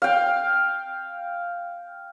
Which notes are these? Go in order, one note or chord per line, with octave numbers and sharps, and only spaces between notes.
F5 G5